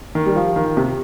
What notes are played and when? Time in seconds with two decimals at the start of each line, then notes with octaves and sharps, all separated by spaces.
0.15 D#3
0.26 G3
0.36 F3
0.56 D#3
0.77 C3